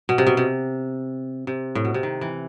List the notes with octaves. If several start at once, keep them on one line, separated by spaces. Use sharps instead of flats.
B2
C3
B2
C3
C3
A2
B2
C3
D#3
E3